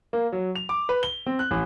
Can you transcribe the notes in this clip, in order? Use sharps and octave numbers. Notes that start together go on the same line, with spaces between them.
A#3
F#3
F7
D6
B4
G7
C4
F#6
A1